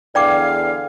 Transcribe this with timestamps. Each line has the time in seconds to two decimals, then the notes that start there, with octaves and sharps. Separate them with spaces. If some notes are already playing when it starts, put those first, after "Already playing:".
0.15 E2 D3 D5 F5 G5 D6